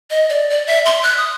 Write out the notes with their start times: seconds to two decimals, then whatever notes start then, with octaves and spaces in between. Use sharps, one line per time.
0.10 D#5
0.29 D5
0.50 D5
0.67 E5
0.85 C6
1.03 F#6
1.17 D#6